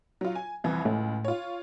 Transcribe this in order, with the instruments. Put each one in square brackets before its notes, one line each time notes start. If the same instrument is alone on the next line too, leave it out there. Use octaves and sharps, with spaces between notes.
[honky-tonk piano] F#3 F4
G#5
C2 F2 E3
[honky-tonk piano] C#2 [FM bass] A2
[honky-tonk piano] F4 C#5